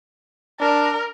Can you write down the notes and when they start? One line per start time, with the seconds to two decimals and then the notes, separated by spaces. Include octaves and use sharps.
0.60 D4 A#4